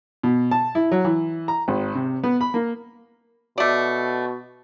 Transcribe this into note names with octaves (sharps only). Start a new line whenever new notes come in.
B2
A5
E4
F#3
E3
A#5
G#1
C3
B3
B5
A#3
B2 A3 D5